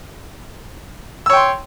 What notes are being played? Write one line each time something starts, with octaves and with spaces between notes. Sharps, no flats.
C#5 G5 C6 E6